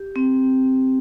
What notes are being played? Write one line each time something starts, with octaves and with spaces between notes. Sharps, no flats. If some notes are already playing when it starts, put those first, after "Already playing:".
Already playing: G4
C4